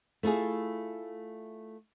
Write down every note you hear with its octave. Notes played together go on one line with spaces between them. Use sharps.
A3 E4 F4 G#4